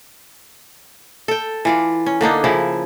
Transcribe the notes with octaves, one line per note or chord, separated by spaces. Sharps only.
A4 G5
E3 F4 D5
C#4
D3 A#3 D4 D#4
C#3 F3 E4